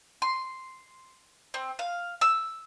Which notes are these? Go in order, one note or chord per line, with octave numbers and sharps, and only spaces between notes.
C6
C4
F5
E6